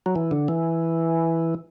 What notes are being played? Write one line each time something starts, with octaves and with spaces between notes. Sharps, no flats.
F#3
E3
D3
E3